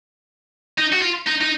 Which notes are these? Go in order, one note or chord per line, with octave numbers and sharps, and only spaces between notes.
D#4
F#4
F4
D#4
D#4